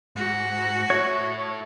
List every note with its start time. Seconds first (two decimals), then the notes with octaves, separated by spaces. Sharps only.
0.16 G#2 F#4
0.90 E4 A4 C#5